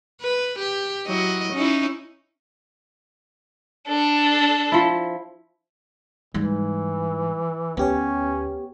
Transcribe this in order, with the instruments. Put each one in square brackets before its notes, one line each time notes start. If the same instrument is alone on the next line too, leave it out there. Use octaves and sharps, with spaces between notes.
[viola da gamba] B4
G4
F#3 E4 D#5
C#4 D#4 E4
[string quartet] D4 A4
[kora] F3 E4
[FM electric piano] G#2 [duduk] E3 [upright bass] G3 D#4
[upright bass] D2 [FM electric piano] B3 G4 C#5 [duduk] C#4